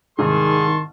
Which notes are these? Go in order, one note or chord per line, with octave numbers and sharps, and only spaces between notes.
C2 G#2 D#3 G#4 A5 C6 C#6